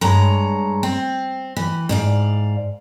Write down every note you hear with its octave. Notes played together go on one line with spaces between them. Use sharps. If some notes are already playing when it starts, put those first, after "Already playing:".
G2 G#3 C#5 A#5
C4
E3
G#2 D5 F5